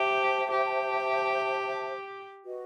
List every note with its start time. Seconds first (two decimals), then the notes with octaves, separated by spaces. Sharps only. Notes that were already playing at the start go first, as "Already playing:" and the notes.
Already playing: G4 C5 E5 A5
0.51 G4
2.44 F#4 B4 D#5